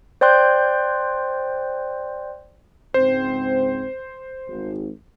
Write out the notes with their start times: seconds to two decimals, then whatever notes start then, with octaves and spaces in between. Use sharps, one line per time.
0.21 C5 D5 G5 C6 F#6 G6
2.94 C#2 G#2 C4 C5
4.48 G#1